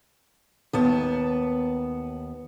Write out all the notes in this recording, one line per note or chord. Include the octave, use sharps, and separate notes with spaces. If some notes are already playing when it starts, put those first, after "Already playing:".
D#2 B3 A5